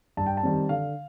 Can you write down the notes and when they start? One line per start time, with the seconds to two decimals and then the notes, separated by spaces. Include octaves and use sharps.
0.17 G2 A5
0.27 G5
0.37 A5
0.43 D#3 G3 C4
0.69 D3 F5